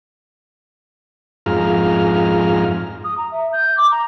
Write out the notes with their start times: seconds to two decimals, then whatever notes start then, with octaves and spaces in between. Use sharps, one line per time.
1.46 F2 G#2 F4 G#4 A#5 F6
3.04 D#6
3.17 A#5
3.31 E5
3.53 G6
3.77 D6
3.91 A#5